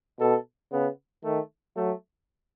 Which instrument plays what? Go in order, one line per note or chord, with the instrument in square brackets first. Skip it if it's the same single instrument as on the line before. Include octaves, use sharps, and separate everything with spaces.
[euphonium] B2 [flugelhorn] A4
[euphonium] C#3 [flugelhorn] B3
[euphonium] D#3 [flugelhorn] A3
[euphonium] F#3 [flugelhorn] A3